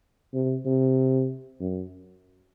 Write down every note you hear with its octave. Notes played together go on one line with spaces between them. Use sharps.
C3
C3
F#2